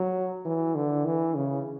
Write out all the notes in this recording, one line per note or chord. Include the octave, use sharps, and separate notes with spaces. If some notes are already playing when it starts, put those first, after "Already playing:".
Already playing: F#3
E3
D3
E3
C#3